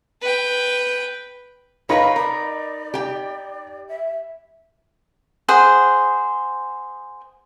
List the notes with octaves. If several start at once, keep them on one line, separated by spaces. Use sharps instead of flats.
B4 G5
D#4 A#4 B4 C#5 F5 B5 A#6
A#4 D5
G4 G5
E5
G#4 C5 F#5